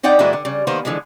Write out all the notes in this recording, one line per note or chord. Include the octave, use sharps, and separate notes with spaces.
C4 D#4 D5 F#5 G5
A#2 E3 G3 G#3 E4 F#4
D3
C#3 G3
D#3 A#3 B3 B4 C5
D3 E3 F3 G#3